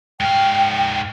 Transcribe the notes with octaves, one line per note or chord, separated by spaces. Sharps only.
G#2 F5 G5